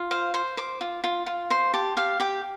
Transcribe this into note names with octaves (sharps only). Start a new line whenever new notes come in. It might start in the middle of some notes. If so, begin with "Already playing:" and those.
Already playing: F4
C5 F5
C5 C6
C5 D6
F4
F4
F4
C5 C6
G4 A5
G4 F5
G4 G5